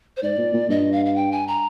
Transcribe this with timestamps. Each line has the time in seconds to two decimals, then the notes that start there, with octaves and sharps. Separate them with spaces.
0.17 C5
0.22 G#2 D5
0.38 A#2
0.54 A#2
0.69 G2 D#5
0.92 F5
1.05 F5
1.16 G5
1.32 G#5
1.47 A#5